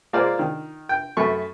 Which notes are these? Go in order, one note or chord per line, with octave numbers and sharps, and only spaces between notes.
G#3 A#3 F4 A#4 C5 D5
D#3
G5
F#2 A3 B5 C#6